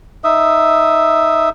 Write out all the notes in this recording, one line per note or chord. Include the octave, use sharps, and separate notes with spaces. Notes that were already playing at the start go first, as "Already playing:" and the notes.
D#4 E5 D#6